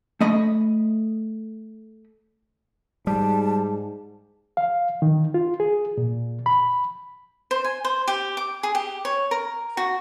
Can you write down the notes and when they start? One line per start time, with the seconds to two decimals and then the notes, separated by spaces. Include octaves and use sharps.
0.21 A3 D#5 B5
3.07 G#2 G3 A5
4.57 F5
5.02 D#3
5.34 F4
5.60 G#4
5.98 A#2
6.46 B5
7.51 C5
7.64 G#5
7.85 C5
8.08 G4
8.37 D6
8.63 G#4
8.75 G4
9.05 C#5
9.31 A#4
9.77 F#4